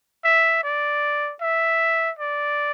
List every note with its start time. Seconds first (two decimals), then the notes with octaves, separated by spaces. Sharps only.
0.24 E5
0.64 D5
1.41 E5
2.19 D5